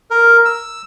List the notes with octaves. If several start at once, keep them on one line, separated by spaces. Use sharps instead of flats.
A#4
E6